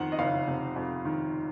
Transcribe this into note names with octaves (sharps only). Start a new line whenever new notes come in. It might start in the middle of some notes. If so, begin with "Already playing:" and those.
Already playing: F2 D#3 C5 F#5
D#5
F#1 F5
C3
F2
D#3